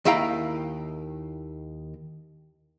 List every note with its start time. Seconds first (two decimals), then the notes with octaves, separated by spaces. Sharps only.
0.05 D#2 D#3 E4 F5 G5 A#5